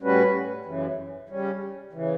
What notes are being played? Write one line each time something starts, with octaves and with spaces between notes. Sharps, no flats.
A2 G3 C#4 F#4 B4
F#2 C#3 E3
C#3 G3 C#4
C#3 E3